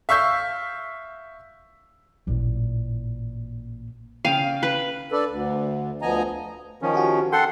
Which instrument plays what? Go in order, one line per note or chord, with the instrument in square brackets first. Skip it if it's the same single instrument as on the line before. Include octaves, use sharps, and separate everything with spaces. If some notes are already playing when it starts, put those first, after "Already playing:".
[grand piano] E5 F5 C#6 E6 G6 B6
[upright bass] A1 A#2
[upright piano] C#3 G5 D#7 [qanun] F5
[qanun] B4
[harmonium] D4 A4 B4 D5
D2
D2 F3 B3 D#5 G#5 A#5
[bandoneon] D#3 F3 C#4
[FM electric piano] F#4 G4
[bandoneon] A4 F#5 C6 [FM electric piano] G5